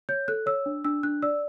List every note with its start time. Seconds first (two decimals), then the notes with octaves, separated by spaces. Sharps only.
0.09 C#5 G6
0.28 A4 F#6
0.46 C#5 E6
0.66 D4
0.85 D4 E6
1.03 D4 F#6
1.22 D5 E6